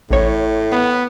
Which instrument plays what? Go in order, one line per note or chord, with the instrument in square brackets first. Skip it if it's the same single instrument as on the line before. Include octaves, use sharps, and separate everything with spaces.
[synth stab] A1 C#5 [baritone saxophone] A2
[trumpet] B3